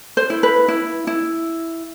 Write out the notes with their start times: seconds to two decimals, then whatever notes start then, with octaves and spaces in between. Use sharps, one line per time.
0.17 C5
0.30 E4
0.43 B4
0.68 E4
1.07 E4